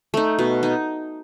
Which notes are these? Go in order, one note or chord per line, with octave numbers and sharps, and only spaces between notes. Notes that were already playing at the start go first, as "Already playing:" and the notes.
A3 D#4
B2
D#4